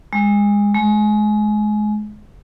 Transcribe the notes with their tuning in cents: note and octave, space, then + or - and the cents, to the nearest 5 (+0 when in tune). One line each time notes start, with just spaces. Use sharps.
G#3 -25
G#3 +25